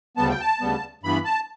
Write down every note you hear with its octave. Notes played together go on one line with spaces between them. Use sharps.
D2 C#3 G3 B3 A5
G5
A5
D2 C#3 G3 B3
G2 E3 B3 B5
A5